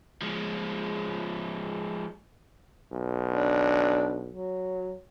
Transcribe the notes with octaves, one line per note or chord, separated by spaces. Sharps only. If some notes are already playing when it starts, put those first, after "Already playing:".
F3 G#3
B1
D4
F#3